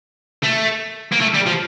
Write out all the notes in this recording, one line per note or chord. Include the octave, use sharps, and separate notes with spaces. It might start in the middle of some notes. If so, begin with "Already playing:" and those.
A3
A#3
A3
G3
F3